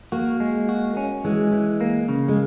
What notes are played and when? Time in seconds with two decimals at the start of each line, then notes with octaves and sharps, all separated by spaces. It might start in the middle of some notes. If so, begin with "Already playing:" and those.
0.12 A#3 F#4
0.40 G#3
0.69 F#4
0.97 C#4
1.24 E3 G#3
1.52 E3
1.81 A#3
2.09 C#3
2.28 G#3